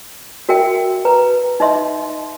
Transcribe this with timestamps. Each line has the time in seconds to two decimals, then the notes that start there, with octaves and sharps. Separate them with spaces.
0.49 F#4 A#4 E5 G5
1.05 B4 A#5
1.60 D#4 D#5 E5 C6